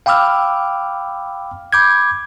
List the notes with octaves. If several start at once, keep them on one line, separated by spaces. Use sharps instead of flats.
F5 G5 B5 D6 E6 F6
B5 D6 G6 G#6